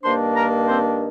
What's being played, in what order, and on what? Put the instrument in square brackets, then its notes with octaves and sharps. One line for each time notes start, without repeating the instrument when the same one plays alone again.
[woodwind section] G2 D#3 A#3 D4 C5 C6
A#4 A#5
C4 C5